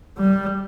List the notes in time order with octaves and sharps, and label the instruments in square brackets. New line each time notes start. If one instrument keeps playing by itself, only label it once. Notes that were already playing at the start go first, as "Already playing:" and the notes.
[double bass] G3